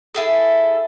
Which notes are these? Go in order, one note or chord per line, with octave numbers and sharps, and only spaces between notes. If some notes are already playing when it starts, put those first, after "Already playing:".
E4 G#4 A4